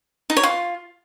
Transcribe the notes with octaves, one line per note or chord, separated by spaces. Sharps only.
D#4
C#5
F4